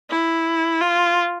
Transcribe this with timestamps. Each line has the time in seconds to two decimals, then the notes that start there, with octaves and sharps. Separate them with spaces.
0.10 E4
0.81 F4